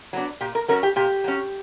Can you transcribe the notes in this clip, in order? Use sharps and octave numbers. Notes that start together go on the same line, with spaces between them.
F#3 B3 D4
A#2 G4
A#4
F#3 C#4 A#4
G4
A#2 G4
F#3 C#4